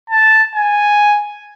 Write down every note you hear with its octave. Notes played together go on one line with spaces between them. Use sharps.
A5
G#5